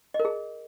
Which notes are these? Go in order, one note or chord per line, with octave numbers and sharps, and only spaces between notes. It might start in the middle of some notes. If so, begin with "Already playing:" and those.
D#5
A#4
G#4